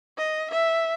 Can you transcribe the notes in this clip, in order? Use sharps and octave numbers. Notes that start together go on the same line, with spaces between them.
D#5
E5